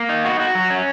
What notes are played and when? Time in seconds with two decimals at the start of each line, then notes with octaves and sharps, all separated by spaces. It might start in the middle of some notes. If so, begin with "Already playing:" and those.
Already playing: A#3
0.09 D#4
0.25 F#4
0.40 F#4
0.55 F#3
0.70 C#4